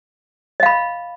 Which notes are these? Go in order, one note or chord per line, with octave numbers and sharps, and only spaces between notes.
D#5 F5 B5